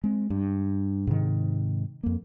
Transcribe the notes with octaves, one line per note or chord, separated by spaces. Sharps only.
G#3 C4
G2
G#2 C3 D#3
F2 A#3